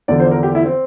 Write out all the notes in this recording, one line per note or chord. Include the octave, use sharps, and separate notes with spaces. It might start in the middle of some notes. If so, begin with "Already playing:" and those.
E2 D3 F3 D5
C5
A#4
G4
E4
C4